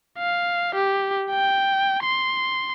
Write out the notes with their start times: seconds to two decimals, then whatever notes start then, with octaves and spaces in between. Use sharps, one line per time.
0.19 F5
0.75 G4
1.30 G5
2.03 C6